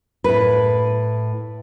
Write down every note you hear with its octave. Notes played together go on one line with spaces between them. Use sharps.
A2 B4